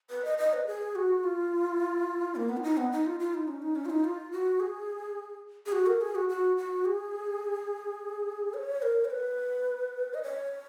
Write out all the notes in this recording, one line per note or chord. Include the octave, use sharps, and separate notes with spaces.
B4
D#5
D#5
B4
G#4
F#4
F4
A#3
B3
F4
D#4
B3
D#4
F4
F4
D#4
C#4
D#4
C#4
F4
D#4
F4
F#4
G#4
G#4
F#4
A#4
G#4
F#4
F#4
F#4
G#4
C#5
A#4
C#5
B4
D#5
C#5